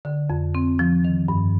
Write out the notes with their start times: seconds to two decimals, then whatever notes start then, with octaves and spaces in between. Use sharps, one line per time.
0.05 D3
0.30 F2
0.55 C4
0.79 F3
1.05 D#3
1.28 G2